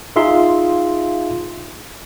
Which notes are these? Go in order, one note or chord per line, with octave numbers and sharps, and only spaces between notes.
D#4 F4 G#4 E5 F5 C6